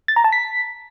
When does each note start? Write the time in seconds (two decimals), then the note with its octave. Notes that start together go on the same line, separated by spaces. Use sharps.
0.08 A6
0.16 A#5
0.24 A5
0.32 B6